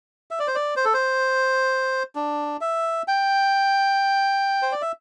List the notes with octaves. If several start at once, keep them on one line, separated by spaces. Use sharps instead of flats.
E5
D5
C5
D5
C5
A4
C5
D4
E5
G5
C5
D5
E5